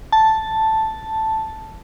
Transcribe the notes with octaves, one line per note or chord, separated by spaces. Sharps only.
A5